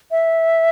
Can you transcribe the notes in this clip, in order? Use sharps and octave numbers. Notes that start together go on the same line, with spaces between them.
E5